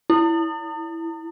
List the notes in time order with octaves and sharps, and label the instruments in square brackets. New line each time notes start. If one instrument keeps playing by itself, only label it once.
[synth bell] E4